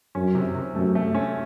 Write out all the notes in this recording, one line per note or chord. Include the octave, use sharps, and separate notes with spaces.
F#2 C#4
C3
C3
F#2 A3
A3
C#4